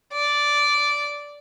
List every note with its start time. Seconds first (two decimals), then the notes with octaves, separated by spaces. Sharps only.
0.13 D5